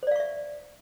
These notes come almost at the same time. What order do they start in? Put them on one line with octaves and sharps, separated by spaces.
C5 D5 F5 C#6 E5